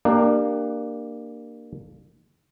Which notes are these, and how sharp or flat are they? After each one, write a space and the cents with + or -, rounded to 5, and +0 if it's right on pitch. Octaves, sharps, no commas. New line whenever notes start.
A#3 +0 D4 +25 G4 +0